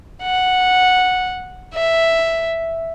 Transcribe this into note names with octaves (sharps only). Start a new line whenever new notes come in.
F#5
E5